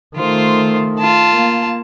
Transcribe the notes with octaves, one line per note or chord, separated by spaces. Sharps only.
D#3 A3 F4 C5
F4 A5
A#3